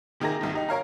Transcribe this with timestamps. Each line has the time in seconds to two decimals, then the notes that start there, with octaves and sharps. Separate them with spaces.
0.20 C3 D#3 A#3 G#4 A#5 A#6
0.41 C2 G2 D#3
0.54 D#4 G4
0.69 A#4 C#5 F5 A#5